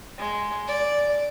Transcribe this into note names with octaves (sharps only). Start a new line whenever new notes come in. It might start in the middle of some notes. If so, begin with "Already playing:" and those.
G#3
D5